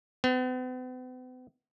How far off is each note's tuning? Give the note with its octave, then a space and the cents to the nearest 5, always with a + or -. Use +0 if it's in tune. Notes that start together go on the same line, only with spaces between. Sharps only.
B3 +45